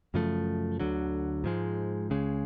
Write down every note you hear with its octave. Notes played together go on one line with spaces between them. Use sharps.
F#2 C#3 F3 A3
D2 D3 F#3
G#2 F3 G#3
C#2 C#3 G#3